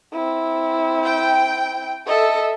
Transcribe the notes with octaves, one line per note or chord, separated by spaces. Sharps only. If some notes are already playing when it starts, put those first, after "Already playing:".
C4 E4
G5
A4 D#5 E5